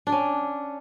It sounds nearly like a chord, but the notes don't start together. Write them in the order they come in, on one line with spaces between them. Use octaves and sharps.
D4 D5 C#4